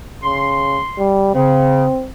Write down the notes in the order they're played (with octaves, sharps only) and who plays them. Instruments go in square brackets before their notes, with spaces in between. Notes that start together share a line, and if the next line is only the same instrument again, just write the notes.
[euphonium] C#3 [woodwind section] C6
[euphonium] G3
[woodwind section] C#3 [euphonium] C4